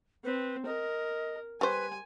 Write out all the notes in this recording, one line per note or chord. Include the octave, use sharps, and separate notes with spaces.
C4 B4
A#4 D#5
G3 B4 C5 G#5